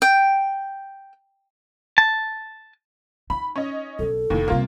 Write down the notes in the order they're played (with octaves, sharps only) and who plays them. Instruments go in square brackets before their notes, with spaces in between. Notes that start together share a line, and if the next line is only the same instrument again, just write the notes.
[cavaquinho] G5
[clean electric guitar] A5
[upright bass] D#4 [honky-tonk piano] B5
[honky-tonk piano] C#4 D#5
[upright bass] B1 B3 [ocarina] A4
[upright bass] F1 [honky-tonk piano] D#2 A2
[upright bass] G2 C3 [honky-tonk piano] A#3 F4